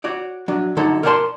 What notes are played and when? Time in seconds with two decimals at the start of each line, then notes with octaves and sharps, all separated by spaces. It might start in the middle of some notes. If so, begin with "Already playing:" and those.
0.04 F#4 C#5 D5
0.48 F#3 D4
0.77 D3 F#3 D#4 A4 C#5
1.03 A#4 C#5 D5 F5 A5 C6